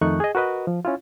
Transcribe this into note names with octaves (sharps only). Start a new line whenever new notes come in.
F2 D#3 A3 D#4 C#6 F#6
G#4 D#5
F#4 A#4 B4 D#5
F3
C#4 E4 F4